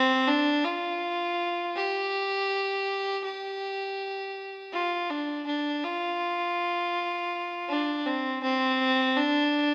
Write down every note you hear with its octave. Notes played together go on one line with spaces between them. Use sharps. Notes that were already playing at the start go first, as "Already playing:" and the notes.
Already playing: C4
D4
F4
G4
G4
F4
D4
D4
F4
D4
C4
C4
D4